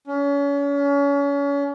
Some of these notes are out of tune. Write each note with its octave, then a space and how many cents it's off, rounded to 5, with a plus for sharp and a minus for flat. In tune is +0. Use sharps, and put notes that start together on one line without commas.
C#4 +35